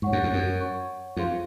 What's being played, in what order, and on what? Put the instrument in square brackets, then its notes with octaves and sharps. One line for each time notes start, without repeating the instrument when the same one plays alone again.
[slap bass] G#2 [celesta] C#5 F#5 C#6
[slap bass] F#2
F2
F#2
[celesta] C#5 F#5 C#6
[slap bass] F2 [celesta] F4 G#4 C5 F5 C6